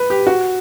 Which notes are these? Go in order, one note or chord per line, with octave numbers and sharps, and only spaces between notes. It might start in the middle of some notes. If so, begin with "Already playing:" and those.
Already playing: B4
G4
F#4